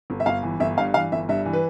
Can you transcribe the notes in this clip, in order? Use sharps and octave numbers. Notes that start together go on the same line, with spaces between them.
G1
E5
G1 F5
E3
G1 E5
G2 F5
E3 F5
G1 E5
G2 E5
E3
B4